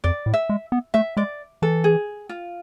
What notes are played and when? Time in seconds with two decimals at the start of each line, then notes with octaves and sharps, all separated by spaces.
0.04 F2 D5
0.26 A2
0.34 E5
0.49 G#3
0.72 B3
0.94 A3 E5
1.17 G#3 D5
1.62 E3 A4
1.84 G#4
2.29 F4